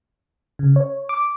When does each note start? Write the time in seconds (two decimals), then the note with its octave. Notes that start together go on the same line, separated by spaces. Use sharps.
0.59 C#3
0.76 C#5
1.09 D6